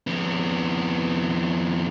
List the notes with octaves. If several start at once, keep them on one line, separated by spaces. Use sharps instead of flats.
F2 B3